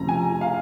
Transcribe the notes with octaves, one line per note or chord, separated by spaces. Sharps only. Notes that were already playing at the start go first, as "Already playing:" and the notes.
Already playing: F1 F2 C#3 F3 A#5
G#5
F5